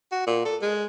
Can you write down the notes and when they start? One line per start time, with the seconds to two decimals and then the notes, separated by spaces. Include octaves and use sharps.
0.12 F#4
0.27 A#2
0.45 A4
0.62 G#3